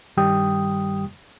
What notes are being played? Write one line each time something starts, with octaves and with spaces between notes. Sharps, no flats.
G2 D#3 G3 G4 G5 D#6